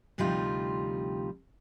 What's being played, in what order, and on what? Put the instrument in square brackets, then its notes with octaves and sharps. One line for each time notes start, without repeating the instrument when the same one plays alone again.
[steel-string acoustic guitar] D2 C3 F3 G3 D#4 F4